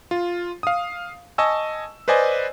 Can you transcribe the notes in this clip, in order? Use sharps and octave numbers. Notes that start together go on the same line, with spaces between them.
F4
F5 D#6
D#5 G#5 A5 C#6 E6
B4 C5 D5 D#5 G#5